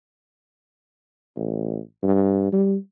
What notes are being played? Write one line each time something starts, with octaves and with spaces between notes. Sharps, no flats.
A1
G2
G3